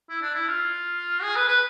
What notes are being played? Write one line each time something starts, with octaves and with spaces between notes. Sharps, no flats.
E4
D4
E4
F4
G#4
B4
B4